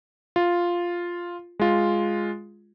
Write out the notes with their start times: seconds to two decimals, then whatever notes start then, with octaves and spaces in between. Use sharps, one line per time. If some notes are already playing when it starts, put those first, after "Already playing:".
0.36 F4
1.60 G#3 F4